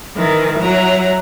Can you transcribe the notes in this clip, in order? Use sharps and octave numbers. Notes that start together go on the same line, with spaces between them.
D#3 E3
F#3 E4 A#5